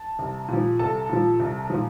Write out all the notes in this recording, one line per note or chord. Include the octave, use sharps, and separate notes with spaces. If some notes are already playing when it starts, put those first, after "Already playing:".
Already playing: A5
C2
A#2 F3
C2 A4 A5
A#2 F3
C2
A#2 F3